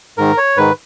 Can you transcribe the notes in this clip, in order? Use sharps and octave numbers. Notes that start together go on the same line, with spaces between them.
G#2 D#3 A#4
C#5
G#2 D#3 B4